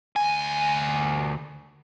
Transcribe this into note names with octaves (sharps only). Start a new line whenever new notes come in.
D2 G#5